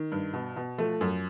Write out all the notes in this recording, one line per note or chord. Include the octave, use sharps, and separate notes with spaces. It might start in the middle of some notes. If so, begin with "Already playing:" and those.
Already playing: D#3
G2
B2
B2
F3 A3
F#2